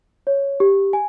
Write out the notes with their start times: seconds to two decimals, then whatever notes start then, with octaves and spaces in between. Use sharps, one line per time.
0.27 C#5
0.60 G4
0.93 G#5